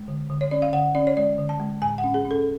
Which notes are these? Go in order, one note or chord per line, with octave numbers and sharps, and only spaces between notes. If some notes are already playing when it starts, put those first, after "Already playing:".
Already playing: G#3
D3
D3
C#5
C#4 D5
F5
D3 F#5
C#4 D5
C#5
G#3 D5
D3
A5
G#3
A2 G#5
F#5
C#4
G#4
C#4
A4